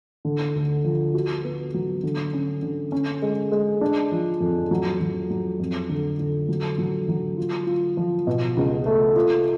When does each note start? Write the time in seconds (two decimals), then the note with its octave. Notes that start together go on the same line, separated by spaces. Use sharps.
0.25 D3
0.55 D2
0.84 F3
1.14 F#4
1.44 B3
1.74 F#3
2.03 D3
2.33 C#4
2.62 D3
2.92 C#4
3.22 G#3
3.52 G#3
3.81 D4
4.12 F3
4.41 F2
4.71 F#3
5.01 F#3
5.30 F#3
5.60 F2
5.89 D3
6.19 D3
6.49 F#3
6.78 F#3
7.08 F#3
7.37 F4
7.67 F4
7.97 F3
8.27 B2
8.57 C#2
8.86 A3
9.16 F4